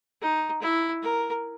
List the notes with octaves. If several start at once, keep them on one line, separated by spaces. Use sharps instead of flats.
D#4
E4
A#4